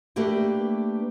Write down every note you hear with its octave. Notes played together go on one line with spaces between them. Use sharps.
A3 A#3 D4 G4 B4